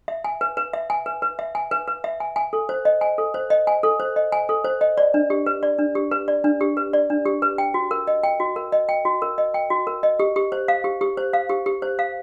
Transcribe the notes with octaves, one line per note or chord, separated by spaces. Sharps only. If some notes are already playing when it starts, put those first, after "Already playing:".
E5
G#5
B4
B4
E5
G#5
B4
B4
E5
G#5
B4
B4
E5
G#5
G#5
A4
C5
D#5
G#5
A4
C5
D#5
G#5
A4
C5
D#5
G#5
A4
C5
D#5
D5
D4
G4
B4
D5
D4
G4
B4
D5
D4
G4
B4
D5
D4
G4
B4
G5
F#4
A#4
D#5
G5
F#4
A#4
D#5
G5
F#4
A#4
D#5
G5
F#4
A#4
D#5
G4
G4
C5
F5
G4
G4
C5
F5
G4
G4
C5
F5